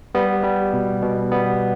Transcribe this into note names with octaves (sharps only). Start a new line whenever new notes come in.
G3 B3
G3
B2
B2
G3 B3